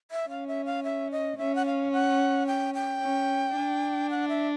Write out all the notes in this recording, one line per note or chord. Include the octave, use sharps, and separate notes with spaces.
E5
C#4 F5
E5
F5
E5
D#5
C#4 E5
F#5
F5
F#5
G5
G5
C#4
D4
F#5
E5